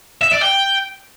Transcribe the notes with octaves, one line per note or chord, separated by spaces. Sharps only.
E5
D5
G5